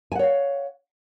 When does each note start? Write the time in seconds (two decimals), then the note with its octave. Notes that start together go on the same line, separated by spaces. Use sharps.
0.12 G#5
0.15 F#5
0.19 C#5
0.23 F5